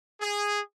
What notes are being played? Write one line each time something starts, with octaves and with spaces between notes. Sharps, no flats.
G#4